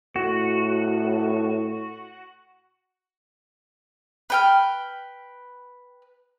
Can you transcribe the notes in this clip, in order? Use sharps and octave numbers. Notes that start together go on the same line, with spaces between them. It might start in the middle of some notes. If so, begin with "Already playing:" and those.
A2 F#4
B4 G5 F6